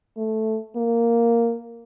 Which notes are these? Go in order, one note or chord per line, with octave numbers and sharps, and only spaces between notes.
A3
A#3